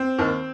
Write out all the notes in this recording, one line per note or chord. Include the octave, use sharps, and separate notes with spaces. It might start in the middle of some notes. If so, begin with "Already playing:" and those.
Already playing: C4
D#2 D#3